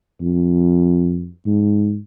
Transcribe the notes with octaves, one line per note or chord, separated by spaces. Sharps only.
F2
G#2